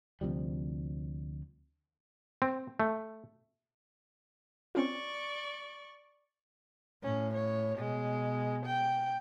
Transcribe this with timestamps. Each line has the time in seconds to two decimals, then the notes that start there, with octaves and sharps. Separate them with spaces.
0.21 D2 C3 F3 G3
2.42 C4
2.80 A3
4.75 C4 C#4 F4 D5 C#6
7.03 A2 C#4
7.34 C#5
7.78 B2 G#3
8.66 G5